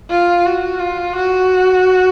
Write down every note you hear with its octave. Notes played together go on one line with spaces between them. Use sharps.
F4
F#4
F4
F#4